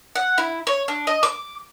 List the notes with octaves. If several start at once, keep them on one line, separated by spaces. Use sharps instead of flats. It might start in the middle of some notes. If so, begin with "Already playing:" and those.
F#5
E4
C#5
D4
D#5
D6